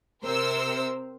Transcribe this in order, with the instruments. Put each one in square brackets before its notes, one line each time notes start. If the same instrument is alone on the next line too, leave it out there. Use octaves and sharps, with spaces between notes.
[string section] C3 A#4 C5 E6